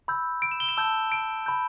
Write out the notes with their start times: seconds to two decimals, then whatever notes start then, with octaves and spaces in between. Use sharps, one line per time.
0.08 B5 E6 G6
0.42 D7
0.51 E7
0.60 G7
0.69 E7
0.77 A5 E6 G6
1.12 D7
1.46 B5 G6